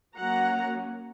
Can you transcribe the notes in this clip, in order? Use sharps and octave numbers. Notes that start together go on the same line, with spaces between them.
F#3 A#3 C#4 F#5 A#5